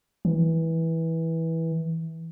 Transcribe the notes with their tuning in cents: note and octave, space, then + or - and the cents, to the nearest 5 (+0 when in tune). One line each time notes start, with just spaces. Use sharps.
E3 -15